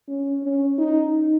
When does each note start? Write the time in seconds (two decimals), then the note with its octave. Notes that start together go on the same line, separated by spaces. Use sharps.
0.08 C#4
0.43 C#4
0.78 D#4